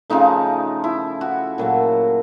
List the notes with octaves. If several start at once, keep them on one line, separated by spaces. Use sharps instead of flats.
C#3 F3 A3 D#4
E4
F#4
A#2 F#3 A3